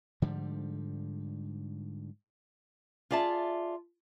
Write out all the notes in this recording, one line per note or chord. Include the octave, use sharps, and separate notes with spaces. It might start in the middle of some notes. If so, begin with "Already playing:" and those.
G#2 D3 F3 G3
F4 G#4 D5 E5 A5